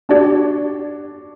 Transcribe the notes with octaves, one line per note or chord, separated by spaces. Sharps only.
D4 F#4 G4 D5 A5